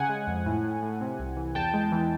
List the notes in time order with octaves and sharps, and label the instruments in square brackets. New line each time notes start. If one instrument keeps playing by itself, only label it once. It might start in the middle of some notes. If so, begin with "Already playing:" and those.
Already playing: [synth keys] C#3 F#5 G#5
G#3
F2
A2
A2
A2
C3
C2
E3
E2 G5 A5
G#3
E3